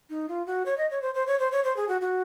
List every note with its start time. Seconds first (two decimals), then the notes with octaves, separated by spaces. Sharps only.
0.10 D#4
0.29 F4
0.46 F#4
0.66 C#5
0.78 D#5
0.91 C#5
1.02 C5
1.15 C5
1.27 C#5
1.40 C5
1.52 C#5
1.64 C5
1.77 G#4
1.89 F#4
2.01 F#4